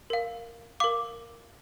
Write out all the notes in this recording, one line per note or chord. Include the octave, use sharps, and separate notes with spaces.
A#4 F5
A#4 F5 D6